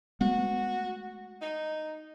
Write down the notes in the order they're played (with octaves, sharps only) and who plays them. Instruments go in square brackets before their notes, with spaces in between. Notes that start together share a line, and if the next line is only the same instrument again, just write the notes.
[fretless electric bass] G#3 A3 B3 [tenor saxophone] F#4
[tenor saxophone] D#4